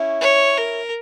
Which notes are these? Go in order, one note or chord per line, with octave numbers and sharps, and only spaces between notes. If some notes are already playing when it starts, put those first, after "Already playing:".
Already playing: C#4 E4
C#5
A#4